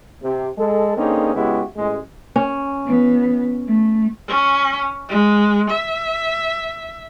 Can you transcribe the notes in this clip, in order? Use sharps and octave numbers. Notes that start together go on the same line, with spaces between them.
C3
G#3 A4
D3 A#3 C4 C#4 D#4 G#4
C#3 G#3 B3 E4 F#4 G4
A1 G#3
C#4
E3 B3
A3
C#4
G#3
E5